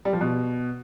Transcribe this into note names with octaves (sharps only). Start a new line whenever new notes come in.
G3
F3
B2